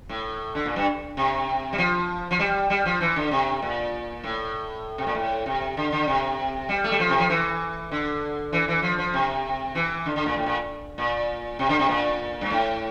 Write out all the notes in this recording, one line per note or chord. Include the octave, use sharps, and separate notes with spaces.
A2
D3
A#2
G2
C3
G3
F3
F3
G3
G3
F3
E3
D3
C3
A#2
A2
C3
A#2
A2
C3
D3
D3
C3
G3
A3
G3
F3
C3
F3
E3
D3
E3
E3
F3
F3
C3
E3
D3
D3
A#2
A2
A#2
A#2
C3
D3
C3
A#2
G2
A2